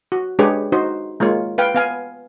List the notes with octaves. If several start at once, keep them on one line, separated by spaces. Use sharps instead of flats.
F#4
G#3 D4 G4 G#4 B4 C#5
D#4 F#4 C5
G#3 A#3 F4 C#5
B4 F5 G5
B3 F5 G#5